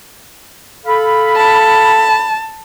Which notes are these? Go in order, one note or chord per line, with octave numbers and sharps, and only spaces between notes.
A4 F5 B5
A5